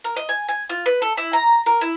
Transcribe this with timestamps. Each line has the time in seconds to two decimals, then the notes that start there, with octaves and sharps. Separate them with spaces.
0.04 A#4
0.16 D#5
0.29 G#5
0.48 G#5
0.69 F4
0.86 B4
1.02 A4
1.17 E4
1.33 A#5
1.66 A#4
1.81 E4